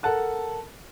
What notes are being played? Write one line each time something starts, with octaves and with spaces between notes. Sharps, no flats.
A4 A#4 F#5 A5 F#6